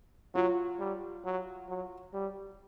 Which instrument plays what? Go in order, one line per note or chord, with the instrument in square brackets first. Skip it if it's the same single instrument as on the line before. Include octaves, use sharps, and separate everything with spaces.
[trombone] F#3 [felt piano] F4
[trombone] G3
F#3
F#3
G3